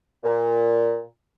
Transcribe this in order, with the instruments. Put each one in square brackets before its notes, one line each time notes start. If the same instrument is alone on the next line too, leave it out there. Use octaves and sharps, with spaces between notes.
[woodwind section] A#2